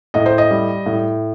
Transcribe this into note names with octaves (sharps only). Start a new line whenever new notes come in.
A2 D#5
C5
D#5
G3
A2